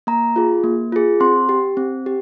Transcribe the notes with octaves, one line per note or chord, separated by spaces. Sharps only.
A#3 A#5
F4 G#4
A#3
F4 G#4
C4 C6
G4
C4
G4